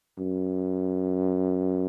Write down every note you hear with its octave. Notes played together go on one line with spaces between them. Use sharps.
F#2